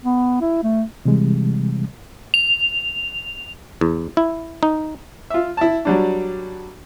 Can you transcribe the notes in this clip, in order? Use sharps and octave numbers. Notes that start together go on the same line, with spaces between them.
B3
E4
A3
C3 E3 G3 G#3
F7
E2
E4
D#4
F4 E5
E4 A5
F#3 G3 D4